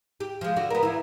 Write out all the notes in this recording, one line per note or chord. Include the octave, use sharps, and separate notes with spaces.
G4
F3 G#3
D3 F#4
B3 A#4
E3 E4